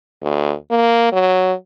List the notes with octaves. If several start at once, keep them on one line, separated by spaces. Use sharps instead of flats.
D2
A#3
F#3